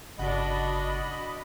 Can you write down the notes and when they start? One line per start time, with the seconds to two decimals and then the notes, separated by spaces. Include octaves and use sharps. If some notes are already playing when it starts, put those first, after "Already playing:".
0.18 G1 C#3 D4 F#4 D#5 F#5 B5